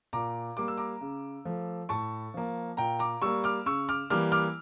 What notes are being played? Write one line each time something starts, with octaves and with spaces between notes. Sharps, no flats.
A#2 A#5 D6
G3 A#3 D6
E6
A#5 D6
C#3
F3 A3
A2 A5 C#6
F3 A#3
A#2 G5 A#5
A#5 D6
G3 A#3 C#6 E6
D6 F6
C#3 C#6 E6
D6 F6
E3 G3 A#3 D6 F6
D6 F6